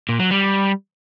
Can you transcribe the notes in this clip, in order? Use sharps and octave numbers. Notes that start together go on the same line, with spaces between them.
A#2
F#3
G3